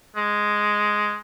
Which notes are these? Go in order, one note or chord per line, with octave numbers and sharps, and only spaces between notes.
G#3